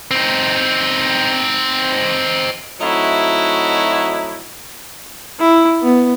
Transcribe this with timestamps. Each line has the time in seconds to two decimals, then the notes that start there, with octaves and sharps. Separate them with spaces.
0.11 C4 D#4
2.80 F#3 A3 C4 D#4 E4 F#4
5.39 E4
5.82 B3